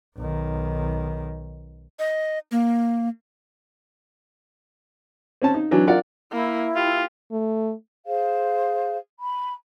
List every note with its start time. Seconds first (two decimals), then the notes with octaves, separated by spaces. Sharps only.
0.16 B1 D#3
1.99 D#5
2.51 A#3
5.42 C4 C#4 A5
5.54 D#4
5.71 E3 F#3 D4
5.87 F4 A#4 D5 F#5
6.32 A#3 E4
6.76 F4 G4
7.32 A3
8.05 G#4 C5 F5
9.18 B5